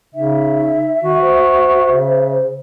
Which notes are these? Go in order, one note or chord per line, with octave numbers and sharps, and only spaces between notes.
C#3 D#4 E5
D#3 F#4
C5
C#3